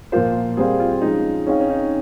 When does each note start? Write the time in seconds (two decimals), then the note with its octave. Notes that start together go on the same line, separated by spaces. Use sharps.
0.12 A#2 F3 A#3 F4 C5
0.57 G3 C4 G4 G#4 C5 F5
0.80 F4
1.02 F3 G#3 C#4 D#4 F4
1.47 C4 C#4 D#4 G#4 C#5 F5
1.60 C#4
1.69 D#4